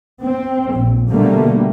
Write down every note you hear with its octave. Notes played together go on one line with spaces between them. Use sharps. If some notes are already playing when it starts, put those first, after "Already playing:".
C4
A#1
B2 D3 G3 A3 A#3